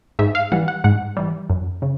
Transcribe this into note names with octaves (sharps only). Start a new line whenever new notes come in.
G#2 E5
F5
E3 G3 F#5
F#5
G#2 F#5
E3 G3
F#2
C#3